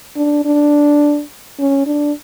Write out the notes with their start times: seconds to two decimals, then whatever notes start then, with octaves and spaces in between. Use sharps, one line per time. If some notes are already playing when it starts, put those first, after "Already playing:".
0.16 D4
0.45 D4
1.59 C#4
1.86 D4